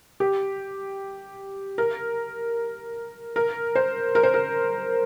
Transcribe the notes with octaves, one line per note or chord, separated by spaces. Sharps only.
G4
A#4
A#4
C5
A#4
C5
A#4